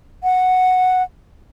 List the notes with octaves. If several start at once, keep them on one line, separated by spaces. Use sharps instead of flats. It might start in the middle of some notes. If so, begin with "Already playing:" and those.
F#5